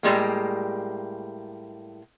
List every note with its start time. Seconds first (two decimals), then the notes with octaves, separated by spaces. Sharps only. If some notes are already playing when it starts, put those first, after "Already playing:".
0.03 A2 G3 G#3 A#3